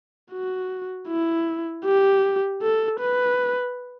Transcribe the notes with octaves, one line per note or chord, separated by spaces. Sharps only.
F#4
E4
G4
A4
B4